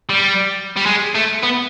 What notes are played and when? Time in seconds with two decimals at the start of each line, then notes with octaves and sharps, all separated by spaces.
0.09 G3
0.76 G3
0.86 G#3
1.15 A3
1.43 B3